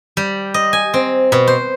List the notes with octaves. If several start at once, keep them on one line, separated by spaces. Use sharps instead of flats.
G3
D#5
G#5
C4
B2
C5